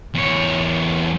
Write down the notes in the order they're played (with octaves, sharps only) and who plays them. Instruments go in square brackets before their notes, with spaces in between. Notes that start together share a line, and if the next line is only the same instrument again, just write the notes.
[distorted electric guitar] E2 C#5